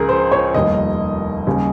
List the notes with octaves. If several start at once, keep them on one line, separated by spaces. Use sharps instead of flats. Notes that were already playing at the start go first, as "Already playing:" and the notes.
Already playing: C#2 C#3 F3 G#4 A#4
C5
C#5
F1 D#2 D#3 G3 D#5
D#2 C#3 G3